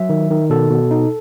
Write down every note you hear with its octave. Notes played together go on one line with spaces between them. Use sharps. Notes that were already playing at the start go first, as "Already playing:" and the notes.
Already playing: F#3 E5
D#3
D#3
B2 A4
B2
D#4